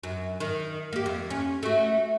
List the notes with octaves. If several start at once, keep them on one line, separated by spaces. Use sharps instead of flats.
F#2
D#3
A#3 G4
F2
C#4
A3 F#4